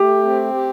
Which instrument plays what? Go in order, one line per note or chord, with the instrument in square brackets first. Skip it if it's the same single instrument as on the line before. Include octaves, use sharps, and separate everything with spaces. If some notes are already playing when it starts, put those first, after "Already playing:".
Already playing: [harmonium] A3 [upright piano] G4
[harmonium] C4
G4